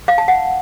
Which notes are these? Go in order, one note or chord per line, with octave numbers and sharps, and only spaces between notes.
F5
A5
F#5